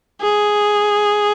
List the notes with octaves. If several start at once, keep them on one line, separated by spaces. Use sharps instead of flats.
G#4